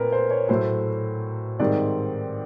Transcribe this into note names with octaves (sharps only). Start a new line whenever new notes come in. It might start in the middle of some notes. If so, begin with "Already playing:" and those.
Already playing: A#2 A3 C4 A#4 B4
C5
C#5
A2 F#3 A3 C5
G#2 D#3 G3 C4 D5